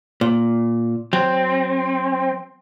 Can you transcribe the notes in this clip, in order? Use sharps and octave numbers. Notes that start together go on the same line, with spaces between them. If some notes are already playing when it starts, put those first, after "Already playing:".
A#2
F#3 C4